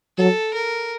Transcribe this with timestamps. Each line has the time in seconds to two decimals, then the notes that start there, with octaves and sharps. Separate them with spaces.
0.18 F#3 A4
0.54 A#4